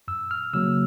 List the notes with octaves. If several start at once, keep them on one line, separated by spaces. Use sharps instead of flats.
F#2 E6
F6
C#3 F#3 A#3 E6